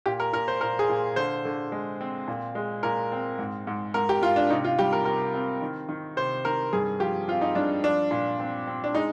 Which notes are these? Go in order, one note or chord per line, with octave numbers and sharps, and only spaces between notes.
A#2 G4
A#4
A#2 A#4
C5
A#2 A#4
G#4
A#2
D3 C5
D3
G#3
C4
A#2
G#3
A#2 A#4
C4
G#2
G#2
G#2 A#4
G4
G#2 F4
D4
C3 D#4
F4
G3 G4
A#4
C3 A#4
C4
D#3
D#3
C3 C5
D#3 A#4
G2 G#4
F3 G4
C4 F4
D#4
G2 D4
F3 D4
A#2
C4
C4
D4
G#3 D#4